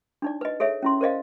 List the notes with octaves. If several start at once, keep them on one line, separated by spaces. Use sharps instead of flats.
D4 D#4 D5
B4 D#5
G#4 A4 C#5 E5
C#4 E4 C6
A#4 C5 D5 D#5 F5